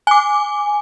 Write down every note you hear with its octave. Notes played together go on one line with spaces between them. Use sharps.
G#5 D6